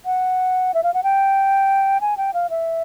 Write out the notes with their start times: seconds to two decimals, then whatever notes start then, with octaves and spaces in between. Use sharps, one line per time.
0.05 F#5
0.74 E5
0.83 F5
0.94 F#5
1.03 G5
2.01 G#5
2.17 G5
2.34 F5
2.50 E5